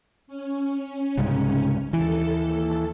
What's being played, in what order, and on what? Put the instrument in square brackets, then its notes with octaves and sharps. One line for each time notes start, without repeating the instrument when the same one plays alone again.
[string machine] C#4
[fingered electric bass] C2 G#2 C#3
[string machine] D#2 A4 [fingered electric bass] E3